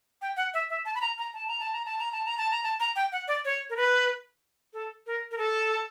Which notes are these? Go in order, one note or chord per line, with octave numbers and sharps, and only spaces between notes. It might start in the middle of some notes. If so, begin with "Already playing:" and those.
G5
F#5
E5
E5
A5
B5
A#5
A#5
A5
A#5
A5
A#5
A5
A#5
A5
A#5
A5
A#5
A5
A#5
G5
F#5
D5
C#5
A#4
B4
A4
A#4
A#4
A4